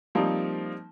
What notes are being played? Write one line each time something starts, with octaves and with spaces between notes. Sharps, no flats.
F3 G3 A#3 C4 D#4